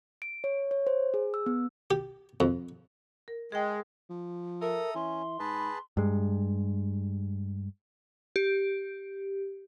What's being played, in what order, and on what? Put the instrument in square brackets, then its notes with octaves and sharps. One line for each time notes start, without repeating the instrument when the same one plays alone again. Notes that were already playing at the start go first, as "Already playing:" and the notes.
[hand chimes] D7
C#5
C#5
C5
G#4
E6
B3
[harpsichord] G4
F2
[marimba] A#4
[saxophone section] G#3 [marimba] G#4 G5
[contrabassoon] F3
[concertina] A4 A#5 D#6 [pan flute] A#4 [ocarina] E5
[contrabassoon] E3 [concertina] C#4 [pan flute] C6
[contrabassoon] G#2 [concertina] G#4 B4 A5 [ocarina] B5
[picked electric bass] G2 G#3
[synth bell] G4